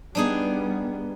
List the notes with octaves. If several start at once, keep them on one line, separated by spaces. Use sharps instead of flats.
G3 B3 D4 D#4 G#4